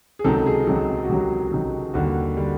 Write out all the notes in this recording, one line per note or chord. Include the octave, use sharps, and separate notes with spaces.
G#4
C#2 C3 D#3 F#3 A4
G#4
C#2 C3 D#3 F#3
F#4
C#2 C3 D#3 F#3 G4
C#2 C3 D#3 F#3
D#2 D3 G3 F#4
D3 G3